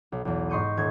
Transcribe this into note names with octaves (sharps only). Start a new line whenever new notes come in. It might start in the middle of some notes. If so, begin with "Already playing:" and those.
B1
B1 E2
G#2 D#5 C6 C#6 G6 D#7
D#1 G#6